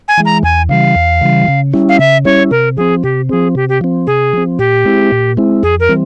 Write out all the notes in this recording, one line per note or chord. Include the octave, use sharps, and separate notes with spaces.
G#5
E3 G#3
A#5
E2 G#5
C#3 E3 G3 F5
E2
C#3 E3 G3
C#3
G3 C#4 E4
F5
C#3 E5
G3 C#4 E4 C#5
C3 A#4
F3 C4 G#4
C3 G4
F3 C4 G#4
C3 G4
G4
F3 C4
C3 G#4
F3 C4
A#2 G4
G#3 C4 E4
A#2
G#3 C4 E4
F2 G#4
A#4
E3 G3 C4